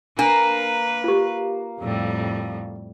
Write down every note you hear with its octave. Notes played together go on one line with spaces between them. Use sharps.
A#3 D4 B4
F4 G4
F2 A2 G3